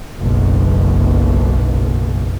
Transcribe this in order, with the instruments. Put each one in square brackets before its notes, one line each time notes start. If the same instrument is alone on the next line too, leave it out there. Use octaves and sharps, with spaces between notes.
[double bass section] F#1 B1